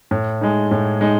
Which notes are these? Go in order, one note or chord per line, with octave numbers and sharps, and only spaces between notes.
A2
G#3 D#4
A2
G#3 D#4